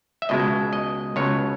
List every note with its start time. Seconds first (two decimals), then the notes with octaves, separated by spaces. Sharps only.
0.22 E5
0.29 C#2 B2 G#3 D#5
0.73 D#5
1.16 C#2 B2 G#3 C#5